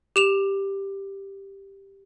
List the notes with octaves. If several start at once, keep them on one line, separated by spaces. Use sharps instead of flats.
G4 E7 F7